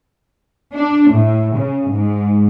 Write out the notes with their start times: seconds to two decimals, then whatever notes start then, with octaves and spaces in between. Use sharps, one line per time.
0.75 D4
1.11 A2
1.56 C#3
1.91 G#2